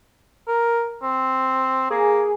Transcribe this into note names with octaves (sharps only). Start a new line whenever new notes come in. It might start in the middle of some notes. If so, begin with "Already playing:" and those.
A#4
C4
A#3 G#4